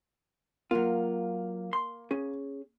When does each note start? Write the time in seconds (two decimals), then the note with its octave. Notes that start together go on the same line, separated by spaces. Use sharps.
0.71 F#3 A#3 F4
1.73 C6
2.11 C#4 G#4